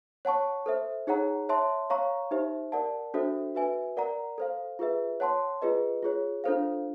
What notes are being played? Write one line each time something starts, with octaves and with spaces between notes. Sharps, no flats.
C#5 F#5 A5 C#6
A4 C5 E5
D#4 G#4 C#5 F#5 A#5
C#5 E5 A5 C6
C#5 F5 A#5 C#6
D#4 G4 C5 E5
A#4 D5 F#5 A5
D4 F#4 A4 C5 E5
F#4 B4 E5 G#5
A#4 D5 F#5 A#5
A4 C5 F5
F4 G#4 B4 E5
C#5 F#5 A5 C6
F4 G#4 B4 D#5
F4 G#4 C#5
D4 F4 A4 C5 F5